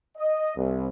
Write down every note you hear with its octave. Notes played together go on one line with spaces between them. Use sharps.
D#5
C2